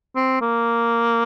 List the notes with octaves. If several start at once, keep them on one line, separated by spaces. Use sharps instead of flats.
C4
A#3